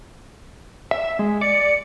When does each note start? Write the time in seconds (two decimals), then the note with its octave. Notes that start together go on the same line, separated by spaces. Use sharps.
0.91 E5
1.19 G#3
1.41 D5 C#7